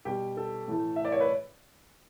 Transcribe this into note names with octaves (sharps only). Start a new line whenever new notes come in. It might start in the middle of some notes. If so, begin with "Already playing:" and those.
B2 G3 G4
A4
A2 E3 A3
E5
D5
C#5
B4